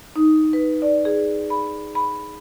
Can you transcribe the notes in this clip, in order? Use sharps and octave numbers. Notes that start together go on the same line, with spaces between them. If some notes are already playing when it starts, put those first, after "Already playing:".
D#4
B4
D5
G#4
B5
B5